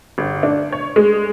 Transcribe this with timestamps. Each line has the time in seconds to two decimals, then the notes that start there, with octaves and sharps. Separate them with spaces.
0.18 G1
0.43 D4
0.72 C#5
0.96 G#3